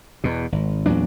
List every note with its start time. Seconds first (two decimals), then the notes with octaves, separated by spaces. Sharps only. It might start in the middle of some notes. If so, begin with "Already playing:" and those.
0.24 E2 B2
0.52 G#1
0.86 E2 A#2 F#3 D4